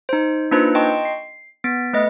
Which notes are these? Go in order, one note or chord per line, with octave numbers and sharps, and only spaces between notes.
D#4 C5
A#3 D4 D#4 F4 B4 C5
D#5 G5 A5 C6 C#6
C7
B3 A6 B6 D7
A3 B4 D#5